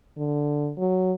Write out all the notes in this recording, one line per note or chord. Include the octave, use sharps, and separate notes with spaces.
D3
F#3